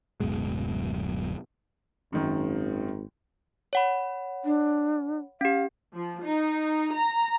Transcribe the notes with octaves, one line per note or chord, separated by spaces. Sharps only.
D1 F#2 B2 G#3
G#1 F#2 D#3
C#5 F#5 B5
D4
C#4 G4 F5
F3
D#4
A#5